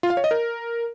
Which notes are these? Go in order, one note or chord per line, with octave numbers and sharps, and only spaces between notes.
F4
F5
C#5
D#5
A#4